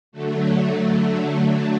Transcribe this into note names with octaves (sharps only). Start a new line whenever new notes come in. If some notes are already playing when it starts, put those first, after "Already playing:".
D3 F#3 A3